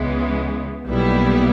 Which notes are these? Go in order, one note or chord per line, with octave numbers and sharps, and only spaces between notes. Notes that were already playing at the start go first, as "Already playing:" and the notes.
Already playing: C#2 C#3 E3 G#3 B3
B1 A#2 G3 B3 E4